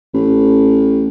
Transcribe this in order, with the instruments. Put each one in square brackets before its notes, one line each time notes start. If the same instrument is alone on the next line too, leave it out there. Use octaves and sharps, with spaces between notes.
[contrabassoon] A1